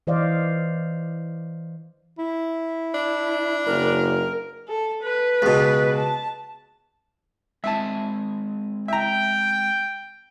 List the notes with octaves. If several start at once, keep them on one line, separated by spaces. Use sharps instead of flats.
E3 C5 D5 D#5 F5
E4
D4
F#1 A#4
A4
B4
C#2 B2
A5
G#3 C4 E5 G#5 A5
E5 G5 A#5